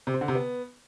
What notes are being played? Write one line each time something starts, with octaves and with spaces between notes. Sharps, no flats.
C3
C4
D3
C3
B3